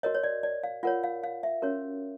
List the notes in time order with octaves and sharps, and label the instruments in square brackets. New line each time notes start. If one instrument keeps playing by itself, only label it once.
[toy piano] F#4 A#4 C#5 D#5
C#5
D5
D5
F5
F4 A#4 C#5 F#5
F5
F5
E5
C#4 F#4 A#4 C#5